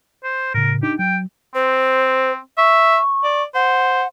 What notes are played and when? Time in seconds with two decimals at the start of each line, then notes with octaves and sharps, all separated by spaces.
0.24 C5
0.55 A2 C#3 A#4
0.83 D4 D#4 G4
0.99 F#3 G5
1.55 C4 C5
2.58 E5 C#6
3.24 D5
3.55 C5 F#5